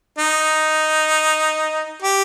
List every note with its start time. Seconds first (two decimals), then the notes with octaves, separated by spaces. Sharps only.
0.18 D#4
2.02 G4